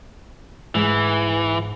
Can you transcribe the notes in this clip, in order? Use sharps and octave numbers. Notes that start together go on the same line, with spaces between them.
G#2 E3